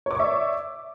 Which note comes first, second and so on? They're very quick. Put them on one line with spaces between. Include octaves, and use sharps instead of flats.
C#5 D6 C#6 E5 D5